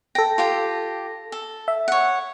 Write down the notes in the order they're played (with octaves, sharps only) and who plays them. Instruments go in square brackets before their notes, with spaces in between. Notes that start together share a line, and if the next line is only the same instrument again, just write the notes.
[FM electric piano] A4 A#6 [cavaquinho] G5
[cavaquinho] F4 G4 G5
A4
[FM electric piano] E5
[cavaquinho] C#5 F#5